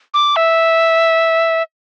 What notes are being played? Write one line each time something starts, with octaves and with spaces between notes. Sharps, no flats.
D6
E5